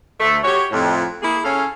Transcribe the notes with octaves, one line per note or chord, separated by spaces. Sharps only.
D2 A3
F#4 G4 C#5
F2 A2
A#3 E4 G#4
C#3 C#4 A4 C#5 F5